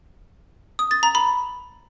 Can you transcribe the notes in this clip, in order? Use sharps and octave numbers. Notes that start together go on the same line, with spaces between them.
D#6
A6
A#5
B5